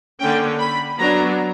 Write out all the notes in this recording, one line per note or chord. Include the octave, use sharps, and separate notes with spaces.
D3 A#3 C#4 G5
B5
F#3 B3 D4 A#5